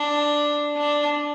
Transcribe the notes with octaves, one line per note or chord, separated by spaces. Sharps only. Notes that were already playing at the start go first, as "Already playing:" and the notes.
Already playing: D4
D4